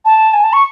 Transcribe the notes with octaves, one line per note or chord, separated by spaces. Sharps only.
A5
G#5
A5
C#6